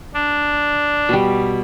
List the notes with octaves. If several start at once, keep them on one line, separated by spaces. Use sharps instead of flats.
D4
B2 G3